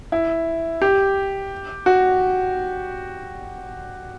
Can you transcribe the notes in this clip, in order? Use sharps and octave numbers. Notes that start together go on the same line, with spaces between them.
E4
G4
F#4